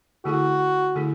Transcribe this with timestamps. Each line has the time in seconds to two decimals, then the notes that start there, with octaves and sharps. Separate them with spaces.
0.25 D3 A3 E4 F#4 G#4
0.96 D3 A3 E4 G#4